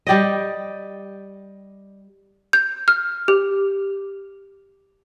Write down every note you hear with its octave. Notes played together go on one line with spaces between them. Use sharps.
G3 G4 D5 D#5
G6
F6
G4